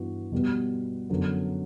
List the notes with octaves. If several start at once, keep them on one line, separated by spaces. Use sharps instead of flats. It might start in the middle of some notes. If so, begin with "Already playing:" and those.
Already playing: G2 E3 B3 F#4
B2 G3 B3
F#2 D3 F#3 B3